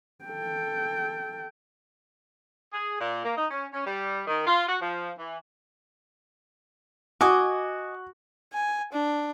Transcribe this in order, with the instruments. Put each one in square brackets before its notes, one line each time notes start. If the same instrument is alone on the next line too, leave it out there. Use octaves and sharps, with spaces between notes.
[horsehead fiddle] A4 G5
[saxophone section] G#4
A#2
A#3
D#4
C#4
C#4
G3
D#3
F4
F#4
F3
E3
[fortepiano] F#4 [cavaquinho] D#5 G#5 D6
[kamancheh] G#5
D4